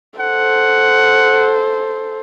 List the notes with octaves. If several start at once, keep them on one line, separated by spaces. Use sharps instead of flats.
A4 C5 F#5